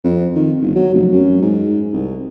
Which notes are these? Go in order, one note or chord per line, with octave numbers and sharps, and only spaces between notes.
F2
D#3
G1
F#3
F1
F#2
G#2
C2